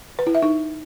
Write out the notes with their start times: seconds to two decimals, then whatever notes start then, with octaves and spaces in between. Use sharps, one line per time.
0.19 B4
0.27 E4
0.35 E5
0.42 D#4